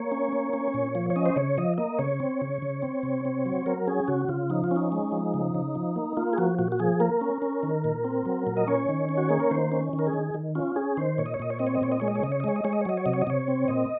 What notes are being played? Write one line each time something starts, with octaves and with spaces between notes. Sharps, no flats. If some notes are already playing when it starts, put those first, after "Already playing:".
Already playing: A#3 C#5
C#4
A#3
C#4
A#2
F3
C#5
C#4 D#5
C5
C#3 C#5
F3 D#5
A#3 D#5
C#3 C#5
C4
C#3
C#3
C4
C3
C4
F#3
F#3 A#4
C#4 G#4
C#3 F#4
C#3 F4
F3 D#4
F4
C#4
D#4
G#3
F3
C#3
C#3
F3
A#3
A#3 F4
G#4
F3 F#4
A#2 F#4
F#4
F3 G#4
A#3 A#4
C#4
C#4
D#3
A#2
C4
F#3
A#2
D#5
C#4 C#5
D#3
C#4
F#4
A#3 G#4
A#4
D#3 C5
C#4
D#3
A#4
G#4
D#3
D#3
C#4 F4
C#4 G#4
D#3 C5
A#2 C#5
D#5
C#5
A#2 D#5
C#5
C4 D#5
C#5
D#5
A#2 C#5
D#5
G#3 C#5
D#5
C#5
C#3 D#5
C#5
D#5
G#3 C#5
D#5
G#3 C#5
D#5
C#5
F#3 D#5
C#5
C3 D#5
C#5
D#5
C3 C#5
C4
A#2 D#5